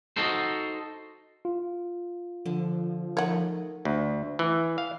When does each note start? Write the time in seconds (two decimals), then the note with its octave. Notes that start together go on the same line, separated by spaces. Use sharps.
0.16 D#4 F#4 A4 C5
1.45 F4
2.46 D3 F3
3.17 A3 D#4 A#4 C#5 F#5
3.85 D2
4.39 E3
4.78 F5